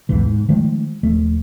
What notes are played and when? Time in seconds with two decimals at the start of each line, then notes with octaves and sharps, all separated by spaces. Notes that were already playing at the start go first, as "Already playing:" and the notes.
0.09 B1 E2 G#2 E3
0.26 G#2
0.49 D#3 F3 G#3 A3
1.03 D#1 F3 A3